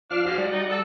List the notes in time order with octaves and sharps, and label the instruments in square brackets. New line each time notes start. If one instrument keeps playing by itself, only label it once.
[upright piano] F3 [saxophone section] D4 [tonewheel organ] F5 F6
[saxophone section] G#2 F3 [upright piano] F#4
[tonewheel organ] G3 D5 F#5
[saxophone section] D#4
A4